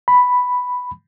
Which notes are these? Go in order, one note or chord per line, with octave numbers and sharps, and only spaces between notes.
B5